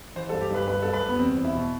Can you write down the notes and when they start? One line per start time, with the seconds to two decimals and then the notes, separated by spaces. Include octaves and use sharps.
0.16 E3 C5
0.29 G2 A4
0.41 G4
0.51 G2 B4
0.67 G2 B4
0.82 G2 A4
0.93 B4
1.03 G3
1.09 B3
1.19 E2 C4
1.37 E2
1.45 E4
1.54 B2